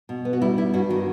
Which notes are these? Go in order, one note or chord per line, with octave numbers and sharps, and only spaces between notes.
B2
B3
F#4
G3 E4
G3 E4
G2 F#4
D#3 F#4